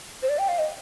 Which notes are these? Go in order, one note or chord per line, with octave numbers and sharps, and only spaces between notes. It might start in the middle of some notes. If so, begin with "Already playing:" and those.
C5
D5
G5
F5
D#5